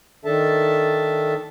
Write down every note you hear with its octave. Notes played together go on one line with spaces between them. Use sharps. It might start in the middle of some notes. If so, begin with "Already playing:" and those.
D#3 D4 A4 E5 A5